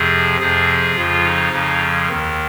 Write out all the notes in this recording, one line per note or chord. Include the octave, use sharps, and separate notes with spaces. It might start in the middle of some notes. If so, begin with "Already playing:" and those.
Already playing: F2 C3 F3 G#4
F2 C3 F3 G#4
F2 C#3 F3 F4
D#4
F2 C#3 F3
D#2 D#3